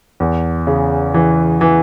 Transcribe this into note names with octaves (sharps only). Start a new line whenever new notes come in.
E2
C#3
E3
E3